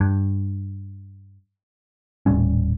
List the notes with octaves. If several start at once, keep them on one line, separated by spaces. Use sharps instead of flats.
G2
D#1 A2 G3 C#4